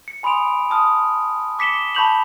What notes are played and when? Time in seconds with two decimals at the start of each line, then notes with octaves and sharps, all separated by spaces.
0.08 C#7
0.23 G#5 B5 C6 D#6 D7 F7
0.70 A5 D#6 F6
1.59 D6 B6 C#7 E7 G7
1.95 A5 B5 C#6 G6 F7 F#7